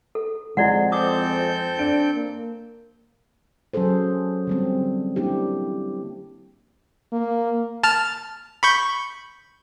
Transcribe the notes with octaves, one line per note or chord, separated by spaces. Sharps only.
A4
F2 G#3 E4 D5 F#5
C4 A4 D6 D#6 G6
D4 D7
A#3
F#3 C#4 G#4 A4 C5
D3 G3 C4
A#3 D4 E4 G4
A#3
A5 F6
B5 C#6 G6